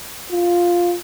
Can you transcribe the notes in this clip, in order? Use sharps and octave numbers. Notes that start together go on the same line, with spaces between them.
F4